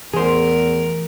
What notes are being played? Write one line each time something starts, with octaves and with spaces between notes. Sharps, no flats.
E2 E3 F3 A3 G#4 A#4 C5